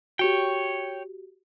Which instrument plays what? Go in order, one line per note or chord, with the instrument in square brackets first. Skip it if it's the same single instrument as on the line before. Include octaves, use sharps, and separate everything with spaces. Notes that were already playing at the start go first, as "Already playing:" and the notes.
[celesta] F#4 G4 [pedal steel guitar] C#5 G5